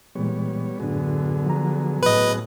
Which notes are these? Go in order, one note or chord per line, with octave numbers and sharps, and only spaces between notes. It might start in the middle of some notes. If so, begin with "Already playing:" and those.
A#2 E3 G3 G#3 B3 C#5
F#2 A2 D3 F#3 B3 D4 G#4
F3 A#5
A2 B4 D#5